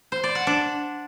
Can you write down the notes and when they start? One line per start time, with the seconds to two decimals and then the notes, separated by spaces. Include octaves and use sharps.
0.12 C5
0.24 D5
0.35 F#5
0.47 D4